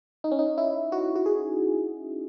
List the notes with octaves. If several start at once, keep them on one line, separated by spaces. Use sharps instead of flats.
D#4
C#4
D#4
E4
F#4
F#4
G#4